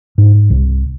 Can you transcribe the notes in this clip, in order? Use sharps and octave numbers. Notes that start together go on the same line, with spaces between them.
G#2
C2